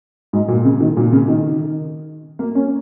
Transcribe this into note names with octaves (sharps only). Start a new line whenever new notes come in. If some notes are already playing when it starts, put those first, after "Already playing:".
G#2
A#2
C#3
D#3
A#2
C#3
D#3
A#3
C#4